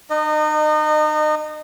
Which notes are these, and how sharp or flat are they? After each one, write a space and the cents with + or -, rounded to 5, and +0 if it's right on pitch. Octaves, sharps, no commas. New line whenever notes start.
D#4 -35 D#5 -25